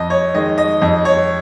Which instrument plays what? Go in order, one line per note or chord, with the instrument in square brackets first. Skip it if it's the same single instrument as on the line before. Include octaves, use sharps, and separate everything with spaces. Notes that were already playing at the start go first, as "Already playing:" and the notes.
Already playing: [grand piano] F2 D#5
C#5
D#3 G#3 D#5
D#5
F2 D#5
C#5